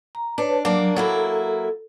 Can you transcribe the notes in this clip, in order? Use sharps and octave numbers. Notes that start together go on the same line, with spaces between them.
A#5
D4 B4 C#5 A5
F#3 A#3 D4
F#3 A#3 E4 A4